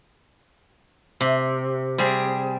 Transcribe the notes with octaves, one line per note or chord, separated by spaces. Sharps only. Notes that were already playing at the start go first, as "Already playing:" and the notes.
C3
G3 C4 G#4